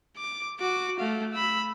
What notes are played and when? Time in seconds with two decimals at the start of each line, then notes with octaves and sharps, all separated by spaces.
0.17 D6
0.60 F#4 D6
0.99 A3 F5
1.33 B5 E6